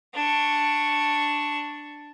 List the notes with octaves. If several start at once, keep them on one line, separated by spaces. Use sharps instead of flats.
D4 C#6